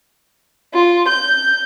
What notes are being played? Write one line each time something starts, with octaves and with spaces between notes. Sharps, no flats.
F4
G6